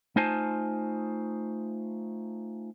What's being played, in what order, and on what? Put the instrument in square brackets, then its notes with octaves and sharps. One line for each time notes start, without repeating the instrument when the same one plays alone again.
[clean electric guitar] A3 D#4 F4 C5 G#5 A5